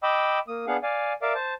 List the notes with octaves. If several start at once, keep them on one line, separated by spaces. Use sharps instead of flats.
D#5 G5 B5 D6 E6
A#3 D#6
B3 D4 G#4 F5 F#5
D5 F5 G#5
A#4 D5 E5 F5 D6
C5 A5